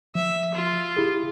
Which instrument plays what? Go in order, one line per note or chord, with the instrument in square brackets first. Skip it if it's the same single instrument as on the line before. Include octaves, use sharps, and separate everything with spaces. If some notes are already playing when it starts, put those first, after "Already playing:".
[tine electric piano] F3 [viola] E5
[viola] F4
[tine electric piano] E4 G4 G#4